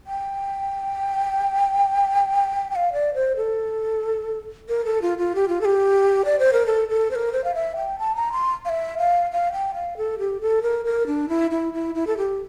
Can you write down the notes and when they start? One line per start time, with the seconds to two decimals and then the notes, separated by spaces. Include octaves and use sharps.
0.07 G5
2.71 G5
2.75 F5
2.93 D5
3.15 C5
3.37 A4
4.69 A#4
4.85 A4
5.02 F4
5.18 F4
5.35 G4
5.48 F4
5.61 A4
5.65 G4
6.25 D5
6.39 C5
6.53 A#4
6.67 A4
6.89 A4
7.11 C5
7.15 A#4
7.32 C5
7.44 F5
7.55 E5
7.76 G5
7.99 A5
8.16 A#5
8.32 C6
8.65 F5
8.69 E5
8.98 F5
9.31 F5
9.52 G5
9.74 F5
9.97 A4
10.19 G4
10.41 A4
10.63 A#4
10.85 A#4
11.07 D4
11.29 E4
11.51 E4
11.74 E4
11.95 E4
12.07 A4
12.17 G4